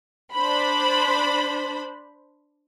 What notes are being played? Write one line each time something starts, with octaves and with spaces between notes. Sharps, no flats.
D4 C5 B5